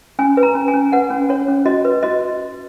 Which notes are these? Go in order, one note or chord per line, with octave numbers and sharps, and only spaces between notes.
C#4 G#5
B4
A#5
C#4
G#5
C#4
B4 F#5
C#4
C#4 C#5
C#4
F#4 D#5
B4
F#4 D#5